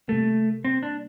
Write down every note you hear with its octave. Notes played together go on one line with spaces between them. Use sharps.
C3 G3 A3 A#3
C4
D4